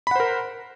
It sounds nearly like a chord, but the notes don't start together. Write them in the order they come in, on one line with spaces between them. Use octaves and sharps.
B5 F#5 C5 A#4